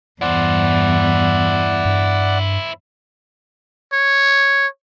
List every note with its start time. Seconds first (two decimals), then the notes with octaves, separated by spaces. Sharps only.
0.22 E2 G2 E4 C5 D5 F#5
1.85 G2
3.93 C#5